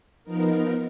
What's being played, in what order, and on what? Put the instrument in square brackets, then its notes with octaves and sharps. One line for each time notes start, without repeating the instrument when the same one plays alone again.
[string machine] F3 B3 D#4 A#4